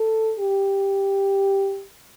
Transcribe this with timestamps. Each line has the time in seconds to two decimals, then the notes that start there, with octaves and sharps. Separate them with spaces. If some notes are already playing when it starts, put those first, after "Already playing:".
Already playing: A4
0.39 G4